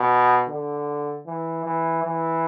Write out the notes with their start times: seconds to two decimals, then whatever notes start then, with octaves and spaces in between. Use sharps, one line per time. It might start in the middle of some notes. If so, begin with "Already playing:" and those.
Already playing: B2
0.49 D3
1.27 E3
1.65 E3
2.04 E3